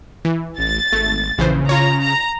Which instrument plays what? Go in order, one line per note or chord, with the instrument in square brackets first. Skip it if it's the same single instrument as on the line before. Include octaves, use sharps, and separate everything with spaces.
[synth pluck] E3
[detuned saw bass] A1 [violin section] A6
[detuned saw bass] G#1 [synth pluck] A3
[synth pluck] A#1 E3 C5 [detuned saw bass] C#3
[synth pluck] F4 C#5 [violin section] A#5
[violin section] A#5